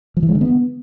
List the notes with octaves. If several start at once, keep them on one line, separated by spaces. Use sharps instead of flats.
F3
E3
G#3
D3
B3